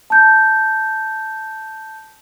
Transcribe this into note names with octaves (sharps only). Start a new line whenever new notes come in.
A5 G6